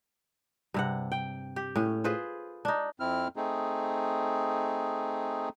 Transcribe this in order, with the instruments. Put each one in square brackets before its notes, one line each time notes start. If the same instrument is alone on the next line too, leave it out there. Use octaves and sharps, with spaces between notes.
[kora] G2 C3 F#5
G5
G4
A2 C#4
F4 G#4 B4 C5
D4 D#4
[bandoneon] F2 C4 E4 F6
A3 C4 D#4 G#4